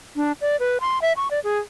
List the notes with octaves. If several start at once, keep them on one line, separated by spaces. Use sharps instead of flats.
D4
D5
B4
C6
E5
C#6
D5
G#4